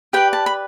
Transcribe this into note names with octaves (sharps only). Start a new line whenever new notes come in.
G4 B4 D5 G5
A5
B5